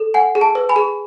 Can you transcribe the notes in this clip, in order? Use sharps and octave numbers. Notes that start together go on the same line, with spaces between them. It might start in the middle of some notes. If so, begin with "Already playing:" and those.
Already playing: A4
F#5 G#5
G#4
A5
B4
G#5 B5
G#4